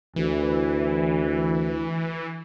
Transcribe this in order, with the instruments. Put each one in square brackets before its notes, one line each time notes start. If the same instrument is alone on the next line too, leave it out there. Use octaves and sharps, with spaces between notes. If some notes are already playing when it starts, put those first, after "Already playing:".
[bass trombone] D2 [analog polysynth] E3